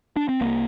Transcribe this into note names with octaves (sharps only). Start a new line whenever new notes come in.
D4
C4
C2 A#3